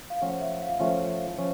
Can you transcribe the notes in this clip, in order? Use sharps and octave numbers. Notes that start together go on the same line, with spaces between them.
F5
F3 A3 C#4 F4 F#5
E5
F5
F3 A3 C#4 F4 E5
F3 C#4